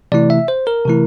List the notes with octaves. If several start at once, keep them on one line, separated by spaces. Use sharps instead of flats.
C3 E3 A3 E4 D5
E5
C5
A#4
C3 E3 A3 E4